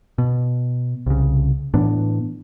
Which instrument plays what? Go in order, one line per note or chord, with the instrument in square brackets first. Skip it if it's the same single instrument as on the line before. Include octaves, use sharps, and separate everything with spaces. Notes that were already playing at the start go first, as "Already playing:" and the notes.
[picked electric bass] B2
C2 C#3
A2 E3 B3 D4